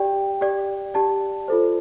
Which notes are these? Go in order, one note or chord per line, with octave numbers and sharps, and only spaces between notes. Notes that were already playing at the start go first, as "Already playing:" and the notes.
Already playing: G4 D5 G5
G4 D5
G4 D5 A5
F4 A4 C5